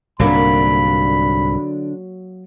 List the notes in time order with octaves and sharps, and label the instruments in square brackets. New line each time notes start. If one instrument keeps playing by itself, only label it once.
[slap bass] C2 G#2 [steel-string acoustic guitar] D3 D4 [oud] F#3 A#3 [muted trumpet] B5